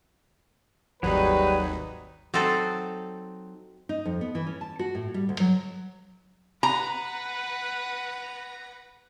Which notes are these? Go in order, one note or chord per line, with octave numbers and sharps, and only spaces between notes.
G#1 D#2 F#3 G3 D#4 F#4 G#4 B4
F#3 C4 D#4 A4
D#4
F2
B3
E3
C#4
A5
F#4
A2
G3
D2
F#3
B4 F#5 A#5